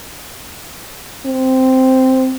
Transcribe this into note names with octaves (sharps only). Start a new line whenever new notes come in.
C4